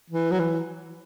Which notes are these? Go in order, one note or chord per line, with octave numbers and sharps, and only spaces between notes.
E3
F#3
E3